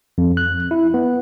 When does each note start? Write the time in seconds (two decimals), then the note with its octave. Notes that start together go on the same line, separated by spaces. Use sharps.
0.18 F2
0.37 F#6
0.71 E4
0.94 B3